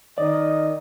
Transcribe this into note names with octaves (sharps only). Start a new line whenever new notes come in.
D#3 D5 D#5